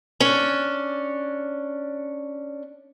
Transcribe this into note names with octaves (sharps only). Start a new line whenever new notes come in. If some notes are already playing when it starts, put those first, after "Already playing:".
C#4 D4